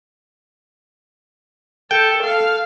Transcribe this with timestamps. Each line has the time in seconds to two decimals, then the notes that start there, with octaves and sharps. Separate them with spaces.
1.91 A4 G5
2.23 A4 F5